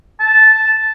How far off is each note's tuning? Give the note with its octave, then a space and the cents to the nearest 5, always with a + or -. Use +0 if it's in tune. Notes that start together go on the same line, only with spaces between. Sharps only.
A5 -5